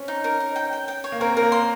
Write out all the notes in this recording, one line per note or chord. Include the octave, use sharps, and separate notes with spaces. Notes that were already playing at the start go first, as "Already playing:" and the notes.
Already playing: C4 C#4
D#4
A#4
D#4
G5
G5
G5
C#5
A#3
C4 A#4
A#4
A#3
C6